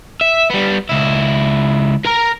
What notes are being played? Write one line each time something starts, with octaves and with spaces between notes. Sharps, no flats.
E5
G3 B3
C#2 E4
A#4 A#5